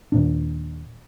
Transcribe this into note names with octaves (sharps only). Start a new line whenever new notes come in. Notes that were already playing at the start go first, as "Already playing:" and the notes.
D#2 A#2 D4